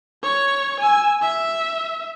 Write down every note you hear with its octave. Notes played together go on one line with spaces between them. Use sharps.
C#5
G#5 E6
E5